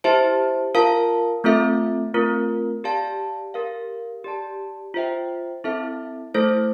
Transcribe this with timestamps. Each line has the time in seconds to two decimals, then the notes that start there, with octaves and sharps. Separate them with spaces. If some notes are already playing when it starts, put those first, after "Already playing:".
0.04 E4 G4 C5 E5 A5
0.75 F4 A#4 F5 A5
1.44 A3 C4 F4 A4 E5
2.14 A3 C4 F4 A#4
2.84 G4 D5 F5 A5
3.54 G4 A#4 F5
4.24 G4 D5 A5
4.94 F4 C5 E5 G5
5.64 C4 E4 A4 E5
6.34 A3 E4 A4 C5